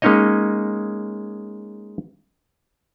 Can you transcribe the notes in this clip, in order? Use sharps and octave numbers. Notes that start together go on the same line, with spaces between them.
G#3 A#3 C#4 D#4 C#5 D#5